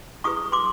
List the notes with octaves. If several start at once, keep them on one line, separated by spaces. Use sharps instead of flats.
E4 G#4 B4 C#6 D#6
C6 D6